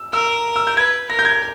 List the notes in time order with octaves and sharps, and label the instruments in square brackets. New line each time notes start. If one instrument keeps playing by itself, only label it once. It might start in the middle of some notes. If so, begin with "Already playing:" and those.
Already playing: [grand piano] E6
[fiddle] A#4 [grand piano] E6
[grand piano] E6
G6
[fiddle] B4 [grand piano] G#6
[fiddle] A#4 [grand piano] A#6
[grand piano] G6
G#6